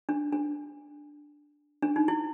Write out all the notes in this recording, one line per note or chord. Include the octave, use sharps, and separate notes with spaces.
D4
D4
D4
D#4
E4